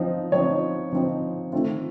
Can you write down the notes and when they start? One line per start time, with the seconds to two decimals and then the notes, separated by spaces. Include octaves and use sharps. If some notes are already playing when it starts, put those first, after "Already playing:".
Already playing: F3 C4 D#4
0.32 F3 C4 D#4 C#5
0.93 F3 C4 D#4
1.52 D#3 A3 C4 F4